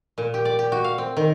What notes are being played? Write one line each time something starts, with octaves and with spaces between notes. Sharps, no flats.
A#2
G4
D5
G4
F#4
F5
C4
D#3